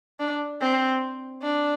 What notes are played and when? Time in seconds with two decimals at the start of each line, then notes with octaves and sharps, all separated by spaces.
0.20 D4
0.61 C4
1.42 D4